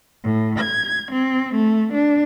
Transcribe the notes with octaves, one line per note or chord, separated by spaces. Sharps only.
A2
G#6
C4
A3
D4